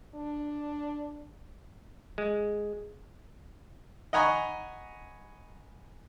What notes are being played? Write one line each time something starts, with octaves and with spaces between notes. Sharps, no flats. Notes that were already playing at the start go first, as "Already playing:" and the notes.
D4
G#3
D#5 F#5 G#5 A#5 B5 C#6